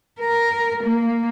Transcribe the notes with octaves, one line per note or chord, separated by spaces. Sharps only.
A#4
A#3